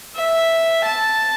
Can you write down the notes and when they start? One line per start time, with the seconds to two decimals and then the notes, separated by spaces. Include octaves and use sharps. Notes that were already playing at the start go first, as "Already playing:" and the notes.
0.16 E5
0.85 A5